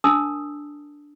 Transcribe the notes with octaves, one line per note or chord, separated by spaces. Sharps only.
D4 A#4 A5 D#6 E6